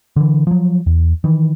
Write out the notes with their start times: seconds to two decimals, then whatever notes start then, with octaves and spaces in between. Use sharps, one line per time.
0.16 D3 E3
0.47 F3 F#3
0.86 E2
1.24 D#3 E3